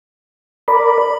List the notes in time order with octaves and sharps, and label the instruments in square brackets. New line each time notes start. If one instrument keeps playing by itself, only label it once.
[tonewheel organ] A#4 D5 [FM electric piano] B5